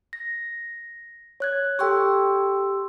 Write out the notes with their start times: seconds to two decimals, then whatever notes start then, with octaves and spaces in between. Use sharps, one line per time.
0.13 A#6
1.40 C#5 F#6 G#6
1.79 G4 A4 G5 C6 C#6 E6